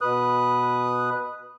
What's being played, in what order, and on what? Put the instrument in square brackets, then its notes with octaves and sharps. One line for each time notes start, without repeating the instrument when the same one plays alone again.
[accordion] B2 B4 D#6 F#6